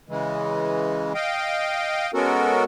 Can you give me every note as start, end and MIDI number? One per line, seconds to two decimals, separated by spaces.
0.09 1.13 49
0.09 1.13 52
0.09 1.13 56
1.14 2.11 75
1.14 2.11 77
1.14 2.11 79
2.14 2.64 56
2.14 2.64 59
2.14 2.64 61
2.14 2.64 66
2.14 2.64 69
2.14 2.64 70